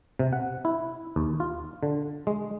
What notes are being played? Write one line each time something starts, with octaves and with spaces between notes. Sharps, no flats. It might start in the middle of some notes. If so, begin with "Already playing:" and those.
C3
F#5
E4
D#2
F4
D3
G#3